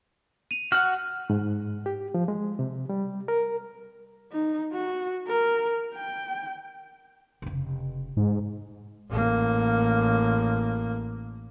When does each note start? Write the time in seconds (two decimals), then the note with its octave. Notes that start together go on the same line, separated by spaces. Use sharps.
0.51 D#7 F7
0.72 F#4 F#5 F6
1.30 G#2
1.86 G4
2.14 F3
2.28 G#3
2.59 C3
2.89 G3
3.28 A#4
4.32 D#4
4.72 F#4
5.28 A#4
5.95 G5
7.42 F1 C#3
8.17 G#2
9.11 A1 A#3